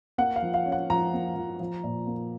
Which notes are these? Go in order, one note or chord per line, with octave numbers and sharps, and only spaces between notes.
A#3 F#5
F5
F3
F5
C#4
F#5
F3 A#5
A#3
F3
F3
A#2
A#3